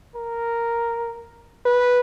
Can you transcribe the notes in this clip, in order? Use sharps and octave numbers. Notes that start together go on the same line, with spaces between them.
A#4
B4